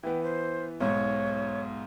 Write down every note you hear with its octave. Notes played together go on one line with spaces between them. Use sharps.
E3 B3 G5
C5
B1 G#2 C#5